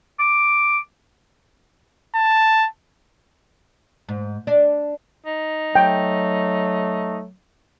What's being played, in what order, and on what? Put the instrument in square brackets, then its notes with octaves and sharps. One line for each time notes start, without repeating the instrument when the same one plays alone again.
[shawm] D6
[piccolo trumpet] A5
[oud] G#2
D4
[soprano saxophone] D#4
[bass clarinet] F#3 [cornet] A3 [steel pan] G5